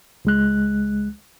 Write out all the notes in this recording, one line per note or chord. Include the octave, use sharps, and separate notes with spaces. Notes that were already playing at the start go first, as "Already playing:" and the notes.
C#2 G#3 F#6